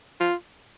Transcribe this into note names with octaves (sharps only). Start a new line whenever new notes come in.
F4